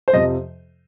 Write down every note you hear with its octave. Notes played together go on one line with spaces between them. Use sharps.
C5
F2 C3 F3 D#5